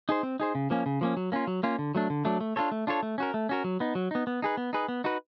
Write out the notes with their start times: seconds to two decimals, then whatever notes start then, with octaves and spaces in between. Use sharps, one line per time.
0.09 D#4 G#4 C5
0.23 C4
0.40 D#4 G#4 C5
0.55 C#3
0.70 F3 A#3 C#4
0.86 C#3
1.01 F3 A#3 C#4
1.17 F#3
1.32 A#3 C#4 F4
1.47 F#3
1.63 A#3 C#4 F4
1.79 D3
1.95 F#3 A3 D4
2.10 D3
2.25 F#3 A3 D4
2.41 A3
2.56 D4 F4 A4 C#5
2.72 A3
2.87 D4 F4 A4 C#5
3.03 A3
3.18 C#4 F#4 A#4
3.34 A3
3.49 C#4 F#4 A#4
3.64 F#3
3.80 B3 D#4
3.95 F#3
4.11 B3 D#4
4.27 B3
4.42 D#4 G#4 B4
4.57 B3
4.73 D#4 G#4 B4
4.88 B3
5.04 D#4 F#4 B4